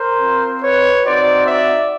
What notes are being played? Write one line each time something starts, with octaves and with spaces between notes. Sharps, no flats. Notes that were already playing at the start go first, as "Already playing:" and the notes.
Already playing: A#4 C5
C4 F4
B4 C#5
C4 D#4 F#4 C5 D5
D5 E5